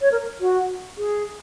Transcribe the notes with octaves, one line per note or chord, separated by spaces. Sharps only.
C#5
A#4
F#4
G#4